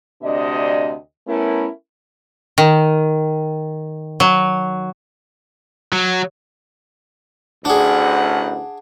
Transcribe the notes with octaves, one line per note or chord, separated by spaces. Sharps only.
D2 C3 D4 D5 D#5
A3 B3 C#4 E4 A#4
D#3
F#3
F#3
A1 D2 D4 G#4 F#5